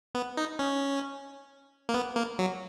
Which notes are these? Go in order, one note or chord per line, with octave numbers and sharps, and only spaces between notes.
B3
D#4
C#4
A#3
B3
A#3
F#3